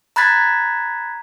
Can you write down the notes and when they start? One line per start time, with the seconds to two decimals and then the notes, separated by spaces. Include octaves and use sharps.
0.16 A#5 B5 F#6 G#6 A6 B6